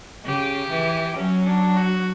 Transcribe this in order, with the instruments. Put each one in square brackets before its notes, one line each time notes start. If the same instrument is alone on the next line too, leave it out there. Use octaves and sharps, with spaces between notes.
[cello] C#3 [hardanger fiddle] G4
[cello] E3
[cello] F#3 [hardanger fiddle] C#4
[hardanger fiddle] D4
F#4